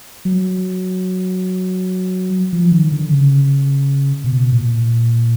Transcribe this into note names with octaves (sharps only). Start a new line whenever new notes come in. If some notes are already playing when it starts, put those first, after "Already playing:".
F#3
F3
D#3
D3
C#3
B2
A#2